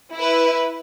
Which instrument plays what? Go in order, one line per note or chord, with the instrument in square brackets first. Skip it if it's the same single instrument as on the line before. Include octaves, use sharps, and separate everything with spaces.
[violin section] E4 B4